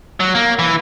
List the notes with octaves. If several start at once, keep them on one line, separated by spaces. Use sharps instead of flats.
F#3
A#3
E3